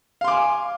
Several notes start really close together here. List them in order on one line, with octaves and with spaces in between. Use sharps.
F5 C6 D6 G#5